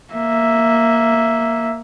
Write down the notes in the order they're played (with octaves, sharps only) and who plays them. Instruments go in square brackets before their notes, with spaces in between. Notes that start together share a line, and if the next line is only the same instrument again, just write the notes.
[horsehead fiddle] A#3 E5